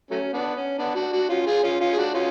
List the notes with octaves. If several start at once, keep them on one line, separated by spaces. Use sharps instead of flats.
F#3 A3 C#4
B3 D4
C#4
B3 D4
D4 F#4
D4 F#4
C#4 F4
F4 G#4
C#4 F4
C#4 F4
G#4
D4 F#4
C#4 F4